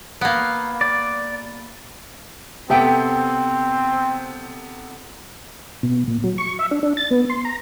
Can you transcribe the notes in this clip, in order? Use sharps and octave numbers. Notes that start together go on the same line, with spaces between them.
A#3 B3
D5
C3 B3 C4 G4 A4 E5 G5
B2
A#2
F#3
C#6
E5
D4
D4
A6
B3
C6
A#5